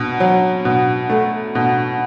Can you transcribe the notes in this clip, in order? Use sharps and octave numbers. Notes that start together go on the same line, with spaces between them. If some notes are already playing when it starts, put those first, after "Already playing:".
Already playing: B2
F#3
B2
A3
B2